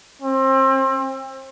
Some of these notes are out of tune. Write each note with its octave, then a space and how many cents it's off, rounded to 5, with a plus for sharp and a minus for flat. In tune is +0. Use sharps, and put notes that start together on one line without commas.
C4 +30